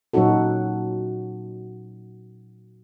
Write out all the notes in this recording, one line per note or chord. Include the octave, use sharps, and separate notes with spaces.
A#2 F#3 C#4 D#4 F#4 A4